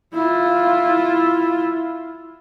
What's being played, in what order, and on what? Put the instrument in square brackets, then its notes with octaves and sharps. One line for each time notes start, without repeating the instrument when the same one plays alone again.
[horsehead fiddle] E4 F4